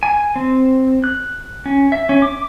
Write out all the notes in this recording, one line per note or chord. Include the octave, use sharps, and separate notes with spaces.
G#5
C4
F#6
C#4
E5
C#4
D6